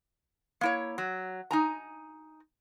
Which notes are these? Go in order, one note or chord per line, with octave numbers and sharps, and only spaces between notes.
A#3 E4 C#5
F#3
D#4 G#5 A#5